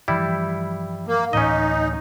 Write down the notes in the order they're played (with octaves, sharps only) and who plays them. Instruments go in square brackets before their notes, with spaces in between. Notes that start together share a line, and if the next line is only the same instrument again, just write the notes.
[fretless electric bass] G2 E3 F3 [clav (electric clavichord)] G3 E4
[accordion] A#3
[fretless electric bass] D1 A2 E3 [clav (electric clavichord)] C#4 D#5 [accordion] D#4